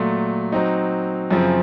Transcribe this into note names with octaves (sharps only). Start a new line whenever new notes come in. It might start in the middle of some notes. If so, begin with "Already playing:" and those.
Already playing: A#2 F#3 A3
F#3 C4 D#4
F#2 C#3 F3 C4